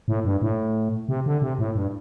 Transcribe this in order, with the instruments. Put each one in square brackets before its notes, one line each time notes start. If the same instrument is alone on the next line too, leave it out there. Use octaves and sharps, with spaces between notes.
[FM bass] A2
G2
A2
C3
D3
C3
A2
G2